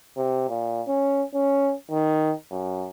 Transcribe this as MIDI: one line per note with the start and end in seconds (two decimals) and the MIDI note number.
0.17 0.45 48
0.49 0.82 46
0.88 1.23 61
1.34 1.74 61
1.91 2.33 51
2.51 2.89 42